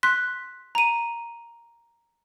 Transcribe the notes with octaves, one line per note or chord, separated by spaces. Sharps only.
C6 F#6 B6
A#5 D#7